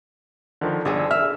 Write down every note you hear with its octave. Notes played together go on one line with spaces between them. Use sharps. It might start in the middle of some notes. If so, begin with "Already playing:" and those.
D3 D#3 F3
G1 D3 G#4 A4
E5 F6